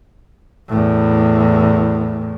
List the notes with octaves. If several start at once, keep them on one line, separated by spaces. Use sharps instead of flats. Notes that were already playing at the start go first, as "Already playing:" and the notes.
E2 A2